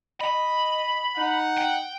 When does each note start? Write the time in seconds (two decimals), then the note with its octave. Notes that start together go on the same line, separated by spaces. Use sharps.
0.21 D#5 B5
1.17 D#4 F#5
1.57 G5